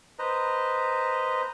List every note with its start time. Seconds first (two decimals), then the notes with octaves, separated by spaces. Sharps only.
0.19 B4 C5 D#5 A#5